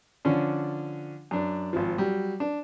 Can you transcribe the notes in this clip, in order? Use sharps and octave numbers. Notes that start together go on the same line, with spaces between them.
D3 F3 C#4 D4
F#2 D4
G#1 F3
F#3 G3
D4